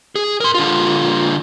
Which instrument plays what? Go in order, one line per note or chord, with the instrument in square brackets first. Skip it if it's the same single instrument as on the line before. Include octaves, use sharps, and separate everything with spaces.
[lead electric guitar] G#4
A#4 C6
D3 F4